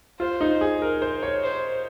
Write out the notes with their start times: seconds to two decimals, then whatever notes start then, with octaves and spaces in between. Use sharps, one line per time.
0.19 F4 C5
0.41 D#4
0.61 G#4
0.82 A#4
1.02 C5
1.23 C#5
1.43 C5